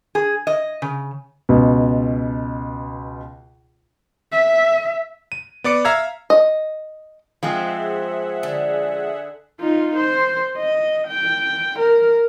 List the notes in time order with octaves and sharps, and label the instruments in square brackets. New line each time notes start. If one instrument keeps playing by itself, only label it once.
[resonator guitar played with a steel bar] G#4
D#5
C#3
[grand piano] C#2 B2
[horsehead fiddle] E5
[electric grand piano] D#7
B3 D5 D6 C#7
E5 F5 A#5 E6 G#6
[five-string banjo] D#5
[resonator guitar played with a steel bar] F3 G#3 C4 [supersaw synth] G#4 E5 F#5
[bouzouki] D3
[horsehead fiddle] D#4 F4
C5
D#5
G5
A#4